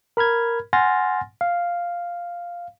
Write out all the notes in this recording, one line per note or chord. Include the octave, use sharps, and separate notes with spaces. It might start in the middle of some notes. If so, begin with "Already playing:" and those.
A#4 B5 F6 G#6
F#5 G#5 C6 F6 A6 A#6
F5